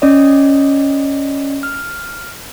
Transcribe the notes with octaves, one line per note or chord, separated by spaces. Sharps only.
C#4 D5 D#5
F6